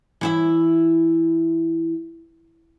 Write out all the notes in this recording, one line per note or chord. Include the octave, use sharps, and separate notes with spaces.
E3 E4 E5